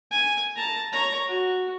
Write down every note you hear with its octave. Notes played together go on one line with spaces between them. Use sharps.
G#5
A5 A#5
C#5 A#5
F#4